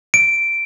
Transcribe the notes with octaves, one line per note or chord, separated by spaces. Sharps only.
D7